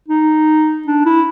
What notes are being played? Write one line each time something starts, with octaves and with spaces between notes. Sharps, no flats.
D#4
D4
E4